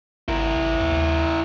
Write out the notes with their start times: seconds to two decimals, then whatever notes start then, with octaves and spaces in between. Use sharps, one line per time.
0.28 G#1 E4 A#4
0.57 A1
0.80 D#2